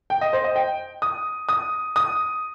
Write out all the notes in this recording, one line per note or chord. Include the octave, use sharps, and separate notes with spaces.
G5
D#5
C5
D#5
G5
D#6
D#6
D#6